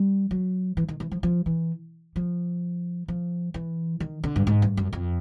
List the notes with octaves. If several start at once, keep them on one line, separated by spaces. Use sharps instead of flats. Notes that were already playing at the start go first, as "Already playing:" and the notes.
Already playing: G3
F#3
E3
D#3
E3
F3
F3
E3
F3
F3
E3
D#3
D3
G2
G#2
G2
F#2
F2